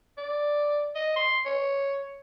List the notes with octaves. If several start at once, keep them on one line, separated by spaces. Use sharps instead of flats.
D5
D#5
C6
C#5